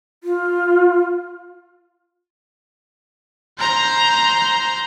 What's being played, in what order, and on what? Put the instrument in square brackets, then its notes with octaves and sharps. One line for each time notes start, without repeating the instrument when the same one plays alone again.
[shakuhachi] F4
[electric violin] C5 A#5